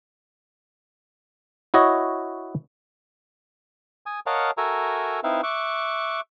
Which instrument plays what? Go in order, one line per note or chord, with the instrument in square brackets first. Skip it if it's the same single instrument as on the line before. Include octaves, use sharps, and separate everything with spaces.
[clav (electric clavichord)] E4 F#4 C#5 D#5
[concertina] G#5 D#6
A#4 C#5 D#5 F5 F#5 A5
F#4 A4 A#4 E5 G#5 A#5
C4 D#4 E4 B4 E5 F5
E5 C#6 D6 F#6